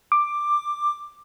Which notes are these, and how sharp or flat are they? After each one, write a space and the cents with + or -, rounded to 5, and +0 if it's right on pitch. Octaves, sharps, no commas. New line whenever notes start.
D6 +10